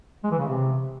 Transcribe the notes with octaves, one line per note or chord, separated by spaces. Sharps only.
G#3
E3
C#3
C3